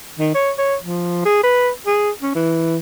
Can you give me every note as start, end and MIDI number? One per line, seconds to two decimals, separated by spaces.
0.19 0.31 51
0.35 0.52 73
0.58 0.76 73
0.83 1.23 53
1.25 1.39 68
1.44 1.70 71
1.87 2.11 68
2.22 2.34 61
2.35 2.78 52